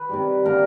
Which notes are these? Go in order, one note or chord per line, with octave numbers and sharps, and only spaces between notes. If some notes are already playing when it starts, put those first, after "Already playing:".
Already playing: B4
C3 D#3 G3
D3 G3 A#3 A#4